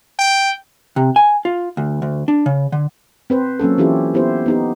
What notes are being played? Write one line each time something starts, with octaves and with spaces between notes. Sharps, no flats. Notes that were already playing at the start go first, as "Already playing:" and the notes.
G5
C3
G#5
F4
D2
D2
D4
C#3
D3
C4 B4 C5
F#3 A#3 C#4 A4
E3 C#4 E4 F4 G4 A4
B3 E4 G4 C5
B3 D#4 G4